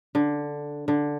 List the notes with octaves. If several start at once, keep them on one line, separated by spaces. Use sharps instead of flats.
D3
D3